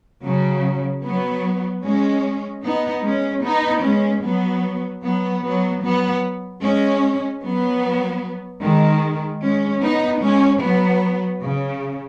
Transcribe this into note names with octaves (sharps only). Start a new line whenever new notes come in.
C#3 F#3
F#3 B3
G#3 C#4
B3 D#4
G#3 C#4
B3 D#4
G#3 C#4
F#3 B3
F#3 B3
F#3 B3
F#3 B3
G#3 C#4
F#3 B3
D#3 G#3
G#3 C#4
B3 D#4
G#3 C#4
F#3 B3
C#3